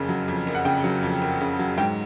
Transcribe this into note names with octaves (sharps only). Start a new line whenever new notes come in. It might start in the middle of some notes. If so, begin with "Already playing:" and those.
Already playing: F#1 F2 C#3
F#3
F2
F#1
F#5
C#3 G5
F#3
F2
F#1
C#3
F#3
G#2 G5